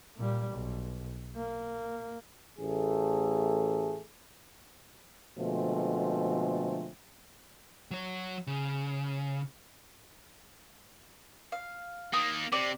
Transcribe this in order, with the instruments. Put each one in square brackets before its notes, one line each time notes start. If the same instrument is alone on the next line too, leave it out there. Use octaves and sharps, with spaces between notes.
[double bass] A#2 G3
B1
A#3
[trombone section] A1 A3 G#4
B2 D3 F3 G#3 A3 C4
[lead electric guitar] F#3 C#5
C#3
[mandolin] F5
[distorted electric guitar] A#3 D#4 [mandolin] D#6
[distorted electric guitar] C3 [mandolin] D5